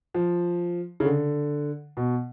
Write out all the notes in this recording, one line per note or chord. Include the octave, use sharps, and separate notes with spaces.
F3
C#3
D3
B2